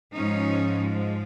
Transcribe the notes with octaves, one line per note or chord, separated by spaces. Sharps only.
G#2 F3 G#3 C#4 D#4